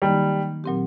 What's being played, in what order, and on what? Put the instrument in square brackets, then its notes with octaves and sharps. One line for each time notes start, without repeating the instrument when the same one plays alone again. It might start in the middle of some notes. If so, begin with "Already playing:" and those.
[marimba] D#3 F#3 A#3 D#4 [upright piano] G3
[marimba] A#2 F#3 C4 G4